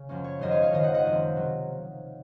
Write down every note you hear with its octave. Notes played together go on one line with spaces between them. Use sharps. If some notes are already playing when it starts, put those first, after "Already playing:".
Already playing: C#3
F#2 F3 A#3 C#4
C#5
G#1 F#2 C#3 F3 C5 D#5
C#5 F5
C#5 F5
G#1 F#2 D#3 C5 D#5
D#5 F#5
D#5 F#5
F#2 F3 C4
C3 F#3